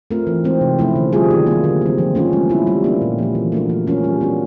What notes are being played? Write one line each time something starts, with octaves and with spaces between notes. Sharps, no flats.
A3 C4 F4 A#4
E3
G#3 C4 D#4
C3
F3 A3 C#4 E4
D3
G3 C4 F4 G#4
D#3
F#3 A#3
D3
G3 C4
F3
A3 C#4 F4 A4
G#3
B3 E4
G3
A#3 D4
A#2
F3 A3
E3
A3 D4 F#4 A#4
F3
G#3 C#4 F4 A#4
G3
B3 D4 F#4 A#4